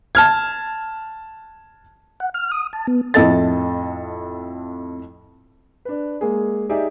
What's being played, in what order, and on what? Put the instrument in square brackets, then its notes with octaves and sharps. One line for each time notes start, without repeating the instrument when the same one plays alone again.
[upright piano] A5 F6 G#6
[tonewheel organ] F#5
F6
D#6
A5
B3
[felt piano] F2 A2 A4 D#5 A6
[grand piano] D4 B4
G#3 A#3 G#4
D#4 G4 G#4 D5 E5